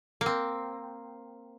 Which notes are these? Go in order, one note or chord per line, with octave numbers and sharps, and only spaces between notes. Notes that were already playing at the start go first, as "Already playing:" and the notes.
A#3
C4